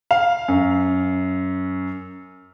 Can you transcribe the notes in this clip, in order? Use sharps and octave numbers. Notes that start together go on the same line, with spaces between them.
F5
F#2